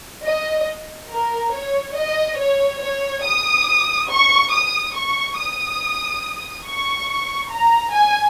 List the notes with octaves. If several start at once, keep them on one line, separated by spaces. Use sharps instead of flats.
D#5
A#4
C#5
D#5
C#5
C#5
D#6
C#6
D#6
C#6
D#6
C#6
A#5
G#5